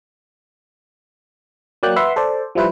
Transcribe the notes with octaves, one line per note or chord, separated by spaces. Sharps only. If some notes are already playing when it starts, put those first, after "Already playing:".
F#3 A#3 D5 G5 F#6
B4 E5 F#5 C6
A4 C5 D5
F3 G3 E4 B4 C5